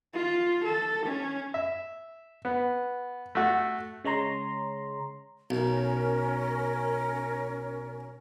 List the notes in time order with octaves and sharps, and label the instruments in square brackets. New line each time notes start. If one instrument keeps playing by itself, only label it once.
[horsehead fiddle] F4
A4
C#4
[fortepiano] E5
B3
A3 F#4
[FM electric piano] C#3 G#3 C#5 A#5 C6
[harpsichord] B1 [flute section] C#4 A#4